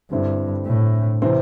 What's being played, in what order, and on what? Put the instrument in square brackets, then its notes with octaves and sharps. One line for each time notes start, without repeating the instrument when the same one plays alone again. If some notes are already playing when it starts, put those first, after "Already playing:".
[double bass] G2 [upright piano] D3 C4 E4
[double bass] A2
[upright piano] C3 E3 C4